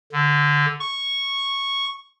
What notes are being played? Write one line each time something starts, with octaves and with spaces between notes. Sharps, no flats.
D3
C#6